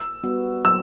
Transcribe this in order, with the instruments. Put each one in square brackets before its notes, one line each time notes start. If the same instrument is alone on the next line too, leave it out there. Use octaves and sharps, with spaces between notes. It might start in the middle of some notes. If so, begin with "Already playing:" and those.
Already playing: [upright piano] E6
[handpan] G3 B3 F#4
[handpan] F#3 [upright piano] E6